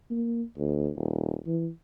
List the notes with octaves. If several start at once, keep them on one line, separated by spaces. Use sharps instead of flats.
A#3
D2
D#1
E3